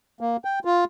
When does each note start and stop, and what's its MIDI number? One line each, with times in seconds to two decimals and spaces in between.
0.21 0.37 58
0.45 0.59 79
0.65 0.84 65